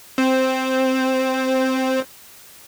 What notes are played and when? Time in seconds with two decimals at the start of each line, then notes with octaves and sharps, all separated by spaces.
0.18 C4 C5